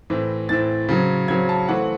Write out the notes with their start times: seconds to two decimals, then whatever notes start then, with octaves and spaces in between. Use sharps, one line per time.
0.10 A2 E3 C4
0.49 A2 E3 C4 A6
0.89 C#3 F#3 C4
1.28 C#3 F#3 C4 G#6
1.49 A5
1.68 E3 A3 C4 F#5